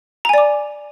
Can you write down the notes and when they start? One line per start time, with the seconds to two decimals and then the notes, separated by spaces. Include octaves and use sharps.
0.25 A#5
0.29 G#5
0.34 D5
0.38 D6